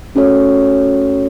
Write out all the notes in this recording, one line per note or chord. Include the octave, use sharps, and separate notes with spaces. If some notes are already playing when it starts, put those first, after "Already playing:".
A3 C#4 F#4 A4 C#5